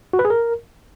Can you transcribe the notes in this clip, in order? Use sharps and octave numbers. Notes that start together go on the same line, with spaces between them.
F#4
B4
G#4
A#4